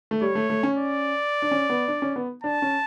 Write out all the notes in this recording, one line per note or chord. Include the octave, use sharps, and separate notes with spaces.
A3
G3 C#5
A3
A3
C#4
D5
D4
C#4
B3
D4
C#4
B3
D4 A5
C#4